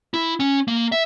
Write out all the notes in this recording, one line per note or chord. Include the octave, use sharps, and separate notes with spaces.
E4
C#4
A#3
E5